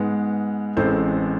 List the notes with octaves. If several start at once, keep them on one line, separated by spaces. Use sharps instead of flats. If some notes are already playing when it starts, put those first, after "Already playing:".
Already playing: G#2 G#3 B3
A1 A2 E3 G#3 C4 A4 C5